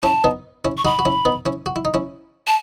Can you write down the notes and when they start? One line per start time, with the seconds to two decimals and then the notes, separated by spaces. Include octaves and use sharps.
0.03 C#4 E4 A5
0.24 B3 D#4
0.65 C#4 E4
0.77 C#6
0.85 D#4 F#4 B5
0.99 F#4
1.05 C#4 E4
1.25 B3 D#4
1.46 C#4 E4
1.66 F#4
1.76 E4
1.85 D#4
1.94 C#4 E4
2.47 A5